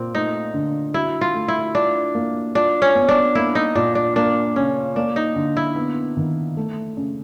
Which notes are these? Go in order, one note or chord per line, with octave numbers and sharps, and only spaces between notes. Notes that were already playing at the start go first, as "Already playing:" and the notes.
Already playing: A#2 A#3 C4
A3 D#4
D3
E4 F#4
F4
A3
E4
D4 F4
A#3
D4 F4
C#4
B3
D4
A#3 E4
D#4
A#2 D4
D4
A#3 D4
C#3 C#4
A#3 D4
D#4
D3
E4
B3
D#3
A3
C#3